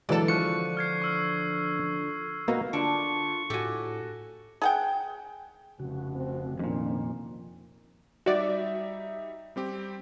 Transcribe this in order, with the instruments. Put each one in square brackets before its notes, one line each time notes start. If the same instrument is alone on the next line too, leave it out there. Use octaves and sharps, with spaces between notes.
[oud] D3 A4 [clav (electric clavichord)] E3 F#3 G#3
[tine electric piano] F3 C#7 [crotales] C#6 F#6
[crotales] F6 G#6 C7
C#6 E6 F6
[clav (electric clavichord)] A#3 B3 F#4 [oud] D#4
[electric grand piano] D3 [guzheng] D4 [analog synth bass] F4 [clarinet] C#6
[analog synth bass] A2 [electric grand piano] F#4 A4 [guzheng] G4 G#5
[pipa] G#4 F#5 G5
[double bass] F1 [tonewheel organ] C#3 F#4
[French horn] C4
[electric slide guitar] F2 A#2 [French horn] D#3 [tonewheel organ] A#3 C#4 D4
[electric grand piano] G3 D#4 E5 [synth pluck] F#4 D5
[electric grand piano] G3 C4 G4